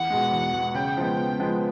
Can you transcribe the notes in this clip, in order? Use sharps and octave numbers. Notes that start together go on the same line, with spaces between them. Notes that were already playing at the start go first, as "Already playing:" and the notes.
Already playing: E2 F#5
B2 G#3
E2
B2 G#3
C#3 G5
F3 G#3 B3
C#3
F3 G#3 B3